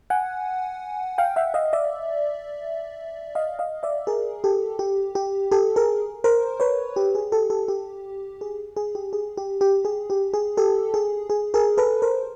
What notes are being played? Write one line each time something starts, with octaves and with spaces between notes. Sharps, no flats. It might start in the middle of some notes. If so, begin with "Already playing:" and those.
F#5 G#5
F5 G5
E5 F#5
D#5 F5
D5 E5
D#5 F5
D#5 F5
D5 E5
G#4 A#4
G4 A4
G4
G4
G4 A4
G#4 A#4
A#4 C5
B4 C#5
G4
G#4
G4 A4
G4 A4
G4
G#4
G#4
G4
G#4
G4
G4
G#4
G4
G#4
G4 A4
G#4
G#4
G#4 A#4
A4 B4
A#4 C5